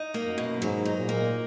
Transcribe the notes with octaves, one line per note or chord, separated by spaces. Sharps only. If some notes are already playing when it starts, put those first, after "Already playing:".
Already playing: D#4
A#3
F#2
B2
G#2 F#3
D#4
A#2
A#3